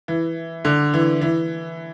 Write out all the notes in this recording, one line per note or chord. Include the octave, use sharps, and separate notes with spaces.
E3
D3
E3
E3